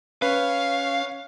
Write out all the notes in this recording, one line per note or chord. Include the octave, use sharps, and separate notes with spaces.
C#4 B4 C#5 F5